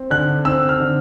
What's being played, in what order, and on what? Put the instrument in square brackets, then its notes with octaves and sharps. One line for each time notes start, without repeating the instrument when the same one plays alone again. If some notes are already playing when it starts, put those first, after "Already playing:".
Already playing: [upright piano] C4
[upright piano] D3 [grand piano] F#6
[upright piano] C4 [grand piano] E6
[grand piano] F6
[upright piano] D3